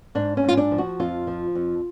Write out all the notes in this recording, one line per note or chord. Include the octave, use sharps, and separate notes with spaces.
G#2 D4
C#4
G#2 F4
D4
F3
F#4
F2 F4
F3
F2